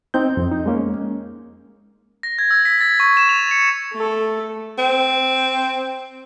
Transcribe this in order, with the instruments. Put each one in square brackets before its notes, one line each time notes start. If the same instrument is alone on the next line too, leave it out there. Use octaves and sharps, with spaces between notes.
[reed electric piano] C4 D#4 G6
F2
D#4
G#3 A#3 C#4
[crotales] A#6
G#6
E6
B6
A6
C#6
E7
F7
C#7
[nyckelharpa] A3 A4
[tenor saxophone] C4